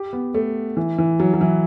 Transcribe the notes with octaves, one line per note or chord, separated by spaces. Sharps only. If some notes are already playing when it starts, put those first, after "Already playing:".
Already playing: G4
B3
A3
E3
E3
F#3
F#3
E3